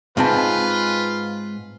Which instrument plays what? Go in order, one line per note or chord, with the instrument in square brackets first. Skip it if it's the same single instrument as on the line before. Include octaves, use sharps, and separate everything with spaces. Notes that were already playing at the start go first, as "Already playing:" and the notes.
[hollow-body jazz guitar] G#2 C4 A5 [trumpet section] F4 B4